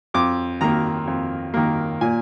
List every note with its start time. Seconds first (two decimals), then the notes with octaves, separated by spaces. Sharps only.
0.14 F2 D6
0.61 D#3 A#3 A#5
1.07 F2
1.54 D#3 A#3
2.01 A#2 G#5